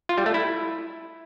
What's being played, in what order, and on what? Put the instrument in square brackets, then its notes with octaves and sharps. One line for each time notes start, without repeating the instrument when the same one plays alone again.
[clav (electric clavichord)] F4
G3
A3
E4